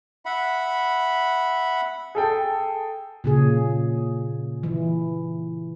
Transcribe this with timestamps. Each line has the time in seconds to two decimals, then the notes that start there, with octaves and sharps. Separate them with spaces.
0.25 E5 F#5 B5
2.15 G#4 A4 G5
3.24 A#2 C#3 G#4
4.63 E3